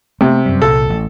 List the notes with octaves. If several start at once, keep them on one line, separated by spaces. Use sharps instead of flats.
C3 A3 B3
F#2 G3
C2 A#2 A4
A1